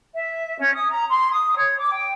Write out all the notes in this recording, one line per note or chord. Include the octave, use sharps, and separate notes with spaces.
E5
C#4
D#6
A#5
C6
D#6
C#5
D6
G5